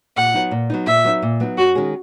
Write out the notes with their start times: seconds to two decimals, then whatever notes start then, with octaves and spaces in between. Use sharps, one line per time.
0.17 A#2 F#5
0.34 F#3 B3 D#4
0.51 A#2
0.70 F#3 B3 D#4
0.87 A#2 E5
1.04 F#3 B3 D#4
1.23 A#2
1.40 F#3 B3 D#4
1.57 F#2 F#4
1.75 D#3 G#3 C#4 G#4